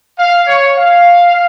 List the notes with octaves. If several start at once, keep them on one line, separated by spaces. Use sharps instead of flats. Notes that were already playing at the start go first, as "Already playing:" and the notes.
F5
C#5
F5